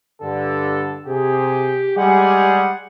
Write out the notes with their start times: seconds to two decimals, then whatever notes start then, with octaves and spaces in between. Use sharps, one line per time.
0.22 G2 D3 A4
1.07 C3 G4 G#4
1.97 G3 G#3 G#4 F#5